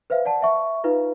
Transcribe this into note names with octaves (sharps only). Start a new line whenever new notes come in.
B4 C5 E5 F5
D5 F#5 A5
E5 C#6
D#4 F4 B4 F5